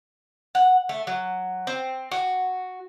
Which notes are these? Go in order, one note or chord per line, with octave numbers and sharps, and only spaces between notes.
F#5
A3
F#3
C4
F#4